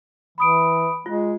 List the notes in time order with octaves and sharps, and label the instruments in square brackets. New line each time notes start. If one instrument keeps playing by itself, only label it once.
[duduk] E3 [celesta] B5 D#6 D7
[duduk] G#3 [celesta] F4